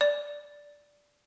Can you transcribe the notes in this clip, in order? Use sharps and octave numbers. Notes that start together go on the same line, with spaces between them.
D5